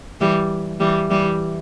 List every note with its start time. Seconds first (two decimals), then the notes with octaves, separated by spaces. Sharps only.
0.21 E3 G3
0.80 E3 G3
1.10 E3 G3